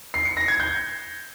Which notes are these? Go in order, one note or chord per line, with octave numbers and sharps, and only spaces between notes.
C7
C#7
A#6
G#6
G6